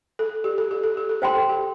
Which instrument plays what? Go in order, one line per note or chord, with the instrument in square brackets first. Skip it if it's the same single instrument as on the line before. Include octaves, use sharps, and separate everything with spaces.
[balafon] A4
G4
A4
G4
A4
G4
A4
[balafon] G4 [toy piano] C5 G5 C6
[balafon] A4
G4